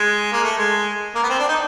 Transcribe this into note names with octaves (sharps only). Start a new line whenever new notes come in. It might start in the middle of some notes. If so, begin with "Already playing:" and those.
Already playing: G#3
A#3
A3
G#3
A#3
B3
C4
D4
D#4